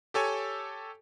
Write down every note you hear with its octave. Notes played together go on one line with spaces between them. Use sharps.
G4 A4 C#5 G#5